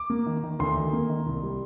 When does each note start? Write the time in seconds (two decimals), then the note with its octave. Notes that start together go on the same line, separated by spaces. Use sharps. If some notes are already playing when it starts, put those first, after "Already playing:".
Already playing: D6
0.10 A#3
0.27 D#3
0.43 D#3
0.59 D2 C6
0.77 D#3
0.93 A#3
1.10 D#3
1.26 C2
1.43 G3